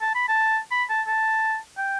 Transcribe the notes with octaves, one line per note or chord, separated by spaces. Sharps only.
A5
B5
A5
B5
A5
A5
G5